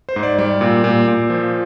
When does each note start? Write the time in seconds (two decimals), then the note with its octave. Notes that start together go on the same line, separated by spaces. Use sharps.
0.09 C5
0.16 G#2
0.23 D5
0.38 G3 D5
0.61 A#2
0.84 A#2
1.08 A#2
1.30 F3